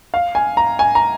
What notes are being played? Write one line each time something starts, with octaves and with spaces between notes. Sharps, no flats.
F5
G#5
A#5
G#5
A#5